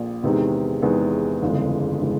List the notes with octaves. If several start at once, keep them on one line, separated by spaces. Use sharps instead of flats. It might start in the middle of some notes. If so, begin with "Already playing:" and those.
Already playing: A#1 A#2
E2 C3 D#3 G#3 B3
E2 C3 D#3 G#3 B3
G1 F2 C#3 E3 G#3
C#3 E3 G#3